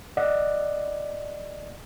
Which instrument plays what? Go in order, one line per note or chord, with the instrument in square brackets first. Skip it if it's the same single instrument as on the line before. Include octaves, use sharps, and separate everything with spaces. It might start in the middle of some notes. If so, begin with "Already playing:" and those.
[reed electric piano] D5 D#5 F#5